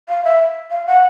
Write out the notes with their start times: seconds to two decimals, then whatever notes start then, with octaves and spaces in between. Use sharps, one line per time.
0.09 F5
0.24 E5
0.71 F5
0.87 F#5